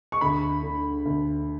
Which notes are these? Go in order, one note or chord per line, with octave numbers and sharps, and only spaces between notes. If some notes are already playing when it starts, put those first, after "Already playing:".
C#6
D2 B5
D3
D2